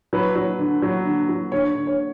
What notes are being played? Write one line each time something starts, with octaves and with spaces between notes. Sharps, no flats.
F#3 B4
F#3
D3
F#3
D3
F#3
D3 C#5
D3
C#5